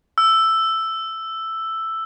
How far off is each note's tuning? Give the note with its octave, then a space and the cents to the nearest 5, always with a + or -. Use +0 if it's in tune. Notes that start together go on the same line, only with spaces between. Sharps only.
E6 +5